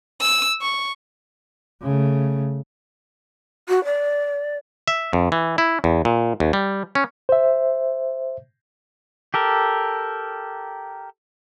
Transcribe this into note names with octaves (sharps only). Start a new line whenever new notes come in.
E6
C#6
C#3 A3
F#4
D5
E5
F2
E3
E4
E2
A#2
D#2
G3
C#4
C5 E5
G4 A4 A#4